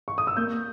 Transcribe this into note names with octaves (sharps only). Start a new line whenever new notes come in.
C#6
D#6
E6
A#3 G6